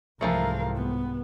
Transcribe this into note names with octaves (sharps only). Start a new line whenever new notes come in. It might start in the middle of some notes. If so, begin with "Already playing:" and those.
C2 G#2 E3 F3 A3 A#4 F5
B3